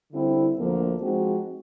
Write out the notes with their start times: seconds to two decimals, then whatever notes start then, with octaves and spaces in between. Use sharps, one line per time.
0.11 D3 G3 C4 E4
0.56 D2 D3 F3 A#3
1.00 F3 G#3 C4 D#4 F#4